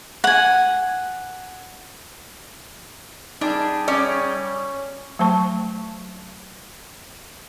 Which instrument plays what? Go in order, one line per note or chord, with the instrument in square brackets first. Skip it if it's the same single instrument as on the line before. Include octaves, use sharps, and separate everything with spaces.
[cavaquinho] F#5 G#5
[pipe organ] G3 G#4 [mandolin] D4 [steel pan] D#4
[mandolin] C#4 [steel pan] D5 D6
[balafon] F#3 A3 C5 A5 C#6